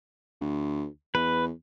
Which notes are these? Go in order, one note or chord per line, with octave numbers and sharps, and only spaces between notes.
D2
E2 B4